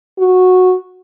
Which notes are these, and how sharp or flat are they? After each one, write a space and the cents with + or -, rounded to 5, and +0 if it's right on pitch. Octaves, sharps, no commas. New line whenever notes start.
F#4 -10